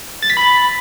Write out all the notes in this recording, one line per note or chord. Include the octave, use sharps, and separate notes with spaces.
A6
B6
B5